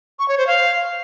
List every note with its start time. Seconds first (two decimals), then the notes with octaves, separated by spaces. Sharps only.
0.19 C#6
0.28 C#5
0.38 C5
0.47 F5